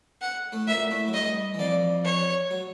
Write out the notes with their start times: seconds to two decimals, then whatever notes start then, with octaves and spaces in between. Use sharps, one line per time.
0.21 F#5
0.52 A2 A3
0.67 A#2 A#3 E5
0.91 A2 A3
1.08 F#3
1.13 G2 G3 D#5
1.54 E3
1.59 F2 F3 D5
2.05 C#5
2.51 F#3